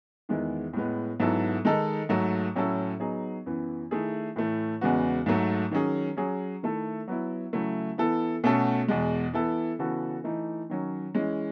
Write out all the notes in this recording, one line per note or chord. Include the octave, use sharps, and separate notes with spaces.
E2 D#3 G#3 B3 E4
A2 G#3 B3
G#2 F#3 B3 E4 A4
D#3 G#3 D#4 A4
G#2 F#3 A3
A2 F#3 C#4 E4 A4
F#3 B3 D#4 G#4
F#2 E3 B3
D#3 A3 E4 G#4
A2 E3 A3
E2 C#3 G#3 B3 F#4
G#2 F#3 A3
D#3 F#3 C#4 G#4
F#3 C#4 G#4
D#3 A3 E4 A4
F#3 B3 E4
C#3 F#3 A3 E4
E3 B3 E4 A4
B2 A3 C#4 F#4 A4
E2 B2 G#3
E3 B3 E4 A4
C#3 E3 B3 F#4 A4
E3 A3 D#4
D#3 F#3 C#4
E3 G#3 C#4